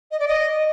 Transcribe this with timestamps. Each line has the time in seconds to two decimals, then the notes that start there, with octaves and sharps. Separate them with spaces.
0.11 D#5
0.20 D5
0.28 D#5